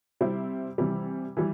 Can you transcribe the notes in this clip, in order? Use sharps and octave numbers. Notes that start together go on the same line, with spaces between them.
C3 G3 C4 E4
C3 E3 G3
E3 G3